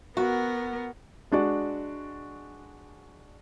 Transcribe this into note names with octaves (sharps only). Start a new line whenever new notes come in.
B3 F#4 A#4
G#3 D4 F#4 D5